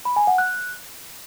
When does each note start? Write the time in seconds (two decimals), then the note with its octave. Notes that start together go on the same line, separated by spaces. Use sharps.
0.05 B5
0.16 G#5
0.27 F#5
0.38 F#6